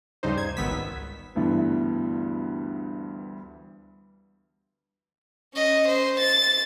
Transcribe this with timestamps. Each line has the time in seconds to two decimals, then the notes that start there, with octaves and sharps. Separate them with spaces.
0.23 D2 G2 C#3 G3 D#4 C5
0.37 G#6
0.57 G#1 C#2 D#3 B3 E6 B6
1.35 D2 G2 E3 B3
5.54 C#4 D#5
5.88 C5
6.20 A6